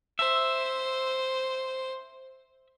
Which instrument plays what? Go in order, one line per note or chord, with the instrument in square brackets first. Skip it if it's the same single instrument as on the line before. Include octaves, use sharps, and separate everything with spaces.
[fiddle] C5 [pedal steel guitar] E5